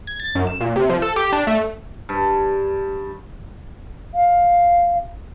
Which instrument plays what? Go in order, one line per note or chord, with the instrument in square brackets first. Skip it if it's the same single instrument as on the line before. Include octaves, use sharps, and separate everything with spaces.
[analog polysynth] G#6
A6
F#2
E7
A#2
C3
F3
A4
G4
D4
A3
[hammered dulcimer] G2
[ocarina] F5